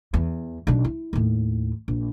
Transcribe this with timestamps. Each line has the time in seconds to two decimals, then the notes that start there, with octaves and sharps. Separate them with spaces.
0.14 E2
0.67 B1 D4
0.85 E4
1.13 D#2 A2
1.88 A#1